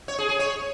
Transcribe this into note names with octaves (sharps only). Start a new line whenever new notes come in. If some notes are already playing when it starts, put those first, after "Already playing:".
C#5
G#4
G#4
C#5